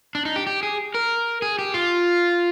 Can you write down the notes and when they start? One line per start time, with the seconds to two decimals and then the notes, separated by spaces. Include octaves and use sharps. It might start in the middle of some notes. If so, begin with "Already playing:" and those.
0.15 D4
0.25 D#4
0.36 G4
0.47 G4
0.63 G#4
0.94 A#4
1.42 G#4
1.59 G4
1.74 F4